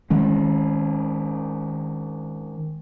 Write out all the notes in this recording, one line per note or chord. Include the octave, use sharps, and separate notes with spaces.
D#3 G#3 C#4